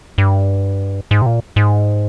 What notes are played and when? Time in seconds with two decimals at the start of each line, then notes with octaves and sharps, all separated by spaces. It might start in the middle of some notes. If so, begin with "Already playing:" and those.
0.18 G2
1.11 G#2
1.22 C3
1.26 A#2
1.56 G#2